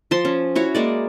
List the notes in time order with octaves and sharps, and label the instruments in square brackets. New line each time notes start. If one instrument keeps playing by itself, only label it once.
[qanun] F3 A5 C6
C#4
E4 F#4 C#5
G#3 A#3 D5